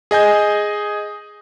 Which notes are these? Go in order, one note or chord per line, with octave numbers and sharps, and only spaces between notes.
G#4 D#5 G#5 G6